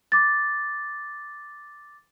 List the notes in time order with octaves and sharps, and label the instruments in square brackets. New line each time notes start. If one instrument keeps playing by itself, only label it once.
[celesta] D6 A6